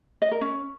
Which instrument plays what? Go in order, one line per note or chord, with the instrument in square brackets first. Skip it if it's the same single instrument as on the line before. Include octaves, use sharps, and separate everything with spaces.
[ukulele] D#5
A#4
C#4